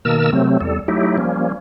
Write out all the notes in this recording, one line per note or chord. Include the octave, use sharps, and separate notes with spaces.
B2 D#3 A#3 A#4 A5 E6
C3 F#3 A3 C4
E2 G3 A4
F#3 A3 D#4 E4 G4
F3 G3 A#3 C#4